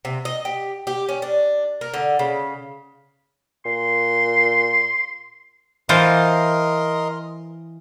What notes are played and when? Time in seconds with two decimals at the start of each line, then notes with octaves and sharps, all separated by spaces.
0.05 C3
0.25 D#5
0.45 G4
0.87 G4
1.09 C#4
1.22 D4
1.81 A#4
1.93 D3
2.19 C#3
3.65 A#2 C6
5.89 E3 F4 A#4 C5 D#5 C6